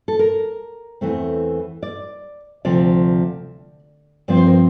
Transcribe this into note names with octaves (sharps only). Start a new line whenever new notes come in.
A4
A#4
E2 E3 A3 C4
D5
D2 C3 F3 D5
G2 F3 C4 D5
C5
A#4